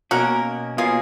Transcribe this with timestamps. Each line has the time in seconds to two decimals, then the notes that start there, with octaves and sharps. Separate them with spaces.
0.11 B2 A#3 C#4 F#4 A#4
0.77 B2 A#3 C#4 F4 G#4